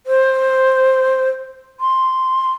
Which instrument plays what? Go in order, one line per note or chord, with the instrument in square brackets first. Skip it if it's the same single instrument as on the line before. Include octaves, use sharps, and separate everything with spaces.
[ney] C5
C6